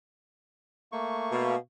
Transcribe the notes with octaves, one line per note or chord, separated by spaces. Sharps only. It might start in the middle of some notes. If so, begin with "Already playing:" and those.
A3 A#3 C#6
B2 F5